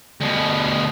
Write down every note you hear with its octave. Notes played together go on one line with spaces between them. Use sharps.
D2 B2